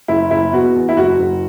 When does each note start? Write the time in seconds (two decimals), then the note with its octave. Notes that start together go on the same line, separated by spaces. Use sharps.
0.08 F#1 E4
0.31 F#1 E4
0.53 B2 F#4
0.75 E2
0.89 E4
0.97 F#1 F#4
1.19 F#1